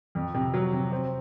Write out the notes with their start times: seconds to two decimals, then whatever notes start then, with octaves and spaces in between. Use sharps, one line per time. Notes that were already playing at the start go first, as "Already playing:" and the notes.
0.15 F2
0.34 C3
0.54 F#3
0.73 C3
0.92 C4